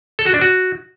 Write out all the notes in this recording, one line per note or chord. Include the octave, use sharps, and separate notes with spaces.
A4
F#4
D4
F#4